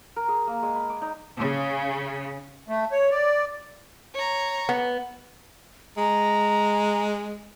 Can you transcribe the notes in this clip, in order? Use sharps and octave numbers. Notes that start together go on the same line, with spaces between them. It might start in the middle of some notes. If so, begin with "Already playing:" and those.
A#4
G#4
A#3
G#3
B5
D6
D#4
C#3
A3
C#5
D5
C#5 A#5
B3
G#3 A#5